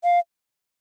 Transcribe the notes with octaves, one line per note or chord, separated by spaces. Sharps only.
F5